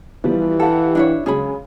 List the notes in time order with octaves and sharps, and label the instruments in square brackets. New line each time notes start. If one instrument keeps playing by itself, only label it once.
[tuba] E3 [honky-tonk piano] F3 G3 B3
[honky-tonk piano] G4 F5 F#5 [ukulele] A4
[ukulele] D4 E4 C#5
[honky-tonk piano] C#3 F#3 G#3 [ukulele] G#4 C#5 B5